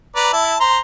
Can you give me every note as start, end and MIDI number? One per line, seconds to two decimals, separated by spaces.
0.16 0.31 71
0.16 0.31 74
0.16 0.31 82
0.33 0.56 64
0.33 0.56 81
0.60 0.78 72
0.60 0.78 82
0.60 0.78 84